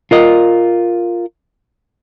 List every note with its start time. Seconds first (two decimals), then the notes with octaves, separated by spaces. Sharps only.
0.11 F4 A#4 D#5